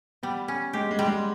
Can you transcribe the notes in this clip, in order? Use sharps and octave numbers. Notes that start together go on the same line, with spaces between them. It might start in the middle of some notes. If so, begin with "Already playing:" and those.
G3 B3
C#4
G#3 G4
G#3
G3
G#3